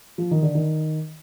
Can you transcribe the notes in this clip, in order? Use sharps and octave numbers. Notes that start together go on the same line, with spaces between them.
F3
D#3
D3
D#3